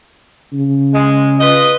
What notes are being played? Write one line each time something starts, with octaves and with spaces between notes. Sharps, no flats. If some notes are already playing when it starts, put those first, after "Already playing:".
C#3
G#3
F4 B4 D#5